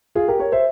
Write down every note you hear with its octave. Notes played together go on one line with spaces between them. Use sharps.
F4 G#4
G4 A#4
A#4 C#5
C5 E5